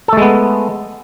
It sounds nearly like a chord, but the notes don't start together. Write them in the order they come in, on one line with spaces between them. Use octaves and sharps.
A4 A3 G#3 B3